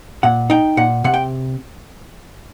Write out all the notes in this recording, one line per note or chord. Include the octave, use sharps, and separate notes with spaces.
A#2 F#5
D#4 G5
A#2 F#5
C3 F#5
G5